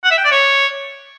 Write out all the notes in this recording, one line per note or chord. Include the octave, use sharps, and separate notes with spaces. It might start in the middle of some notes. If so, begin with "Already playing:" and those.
F#5
E5
G5
D5
C#5